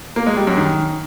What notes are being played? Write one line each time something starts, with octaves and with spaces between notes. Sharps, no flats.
A#3
G#3
G3
F#2
D#3